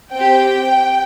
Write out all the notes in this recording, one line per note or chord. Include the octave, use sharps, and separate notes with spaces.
C4 G4 G5